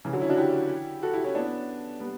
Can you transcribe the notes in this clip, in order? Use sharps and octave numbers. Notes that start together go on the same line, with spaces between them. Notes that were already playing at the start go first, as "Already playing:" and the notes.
C#3 E3
D3 F#3
C#4 E4
D4 F#4
E4 G4
F#4 A4
E4 G4
C#4 E4
B3 D4
G3 B3